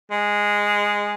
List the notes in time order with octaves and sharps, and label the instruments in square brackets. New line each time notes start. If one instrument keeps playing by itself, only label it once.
[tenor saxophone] G#3